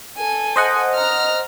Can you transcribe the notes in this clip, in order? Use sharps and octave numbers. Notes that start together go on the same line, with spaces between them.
A4 G#5
C5 D#5 F#5
A#5 F6